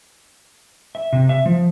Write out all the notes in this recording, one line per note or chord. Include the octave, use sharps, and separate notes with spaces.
E5
C3
E5
F3